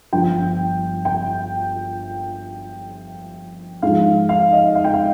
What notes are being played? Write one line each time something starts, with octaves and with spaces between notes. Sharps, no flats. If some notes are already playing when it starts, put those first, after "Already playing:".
G1 G2 F3 G5
G5
G#2 F3 G#3 F5
F5
D#5
F5
G5
F5